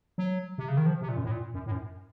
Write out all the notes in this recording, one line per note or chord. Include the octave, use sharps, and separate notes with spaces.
F#3
C3
C#3
D#3
F3
C3
A#2
F#2
A2
A#2
F#2
A2
F#2